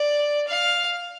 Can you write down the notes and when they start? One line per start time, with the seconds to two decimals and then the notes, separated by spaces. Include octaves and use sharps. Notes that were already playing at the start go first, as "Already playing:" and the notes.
Already playing: D5
0.48 F5